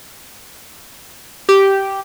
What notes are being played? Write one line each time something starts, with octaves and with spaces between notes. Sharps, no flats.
G4